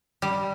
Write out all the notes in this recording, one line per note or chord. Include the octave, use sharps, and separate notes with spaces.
G3